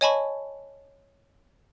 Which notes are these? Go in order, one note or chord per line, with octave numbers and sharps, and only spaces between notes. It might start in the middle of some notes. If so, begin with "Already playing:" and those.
C#5 D#5 G#5 A5 B5 C#6